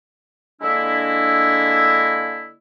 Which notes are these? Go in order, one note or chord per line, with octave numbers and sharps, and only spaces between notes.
D3 G#3 A#3 D4 E4